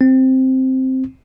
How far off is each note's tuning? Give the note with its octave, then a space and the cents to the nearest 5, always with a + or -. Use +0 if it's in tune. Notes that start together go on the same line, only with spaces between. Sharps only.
C4 +0